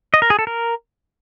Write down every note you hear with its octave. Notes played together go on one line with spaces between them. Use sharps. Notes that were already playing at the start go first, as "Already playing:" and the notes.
D#5
A#4
G#4
A4
A#4